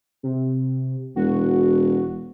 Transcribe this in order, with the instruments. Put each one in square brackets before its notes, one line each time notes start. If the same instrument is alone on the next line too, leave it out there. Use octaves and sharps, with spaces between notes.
[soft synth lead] C3
[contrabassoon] E1 [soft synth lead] F#4